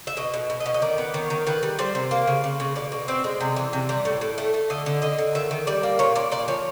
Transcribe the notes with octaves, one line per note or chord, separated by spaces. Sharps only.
E5
B2 D#5
B2
B2
D#5
B2
D#5
D#3 D5
B3
D#3 C#5
D#3
D#3 B4
G3
G3 C5
C3
A#3
C#3
C#3
C#3
B2 D5
B2
C4 D5
G#3
C3
E3
C3
G3
A2
A2
A3
A3
D3 D#5
D3
D3 D#5
D3
D#3 E5
D#3
G3 D5
A#3
A#2 C#5
A#2 D5
A#2 D5
F3 C#5